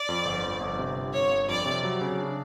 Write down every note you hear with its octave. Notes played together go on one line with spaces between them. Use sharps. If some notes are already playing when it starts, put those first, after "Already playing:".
Already playing: D5
F2
G1
F2
G1
C3
G1
G1 C#5
G1
F2 D5
C3
F#3
C#3
D4